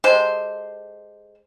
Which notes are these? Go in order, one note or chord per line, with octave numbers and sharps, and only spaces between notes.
G#3 G4 A4 C5